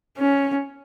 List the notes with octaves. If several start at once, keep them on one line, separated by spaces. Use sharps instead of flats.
C#4